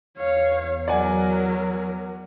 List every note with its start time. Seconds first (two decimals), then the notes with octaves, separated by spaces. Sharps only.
0.18 E2 C#5 F5
0.88 F#3 A#4 D5 F#5 G#5